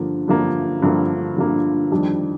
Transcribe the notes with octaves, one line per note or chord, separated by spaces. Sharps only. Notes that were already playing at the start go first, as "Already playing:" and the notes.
Already playing: G2 D3 F3 A#3
G2 D3 F3 A#3
G2 D3 F3 A#3
G2 D3 F3 A#3
F2 D#3 G3 D4